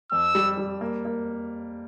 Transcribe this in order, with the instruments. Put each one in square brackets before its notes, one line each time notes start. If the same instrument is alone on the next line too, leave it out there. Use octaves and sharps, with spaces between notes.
[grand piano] F2 [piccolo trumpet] E6
[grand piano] G3
G3
A#3
A#3